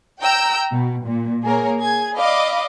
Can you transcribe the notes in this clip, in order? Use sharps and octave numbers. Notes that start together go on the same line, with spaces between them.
G5 A#5 E6
B2
A#2
A#3 G#4 A#4 C#5
G#4 G#6
D5 D#5 F5 B5 D6